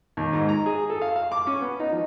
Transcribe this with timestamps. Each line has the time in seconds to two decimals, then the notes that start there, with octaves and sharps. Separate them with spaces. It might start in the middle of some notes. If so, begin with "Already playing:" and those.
0.17 D#2
0.33 G#2
0.49 A#5
0.66 G#4
0.90 A4
1.01 F5
1.16 F5
1.32 D6
1.47 C#4
1.61 B3
1.79 D#4
1.92 F3